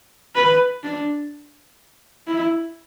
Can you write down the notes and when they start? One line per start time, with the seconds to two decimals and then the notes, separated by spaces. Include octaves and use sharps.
0.36 B4
0.83 D4
2.28 E4